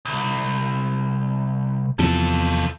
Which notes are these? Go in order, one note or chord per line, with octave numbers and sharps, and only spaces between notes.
C2
E2 C3 F3 F4 A4